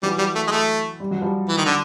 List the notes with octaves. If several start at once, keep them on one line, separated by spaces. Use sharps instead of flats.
E3 F#3 G3
G3
A3
G#3
A3
G3
F#3
F3 G3
E3
D#3
D3